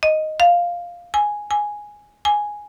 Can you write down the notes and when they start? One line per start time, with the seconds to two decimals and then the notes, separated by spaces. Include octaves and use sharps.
0.03 D#5
0.40 F5
1.14 G#5
1.51 G#5
2.25 G#5